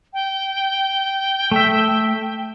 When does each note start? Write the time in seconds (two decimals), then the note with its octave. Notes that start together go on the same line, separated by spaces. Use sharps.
0.13 G5
1.51 A3 E5